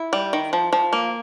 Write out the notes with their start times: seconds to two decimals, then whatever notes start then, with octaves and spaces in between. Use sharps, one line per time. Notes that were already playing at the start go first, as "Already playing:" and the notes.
Already playing: E4
0.13 G3
0.33 D#3
0.53 F3
0.73 F3
0.93 A#3